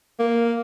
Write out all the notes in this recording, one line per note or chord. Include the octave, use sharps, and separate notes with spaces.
A#3